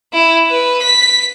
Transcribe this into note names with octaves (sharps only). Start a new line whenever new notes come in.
E4
B4
B6